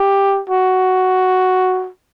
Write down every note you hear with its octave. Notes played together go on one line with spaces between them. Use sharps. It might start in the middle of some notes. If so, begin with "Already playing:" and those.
Already playing: G4
F#4